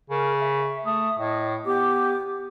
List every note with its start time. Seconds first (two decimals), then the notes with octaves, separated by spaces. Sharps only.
0.10 C#3 A#4
0.40 E5
0.85 A3 D#6
1.18 A2 D#5
1.66 B3 G4 D6